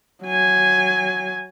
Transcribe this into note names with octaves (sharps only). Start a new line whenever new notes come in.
F#3 G#5